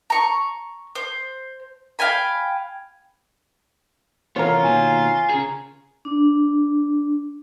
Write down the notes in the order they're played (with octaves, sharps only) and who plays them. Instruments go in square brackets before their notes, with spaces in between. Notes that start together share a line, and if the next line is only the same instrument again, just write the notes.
[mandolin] A#5 C#6
C5
F5 G5 G#5 B5
[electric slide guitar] C3 E3 B3 [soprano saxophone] F4 [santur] A#4 C#5
[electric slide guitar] B2 D#3 A#3 [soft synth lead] G#5
[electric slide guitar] C#3 G#4
[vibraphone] D4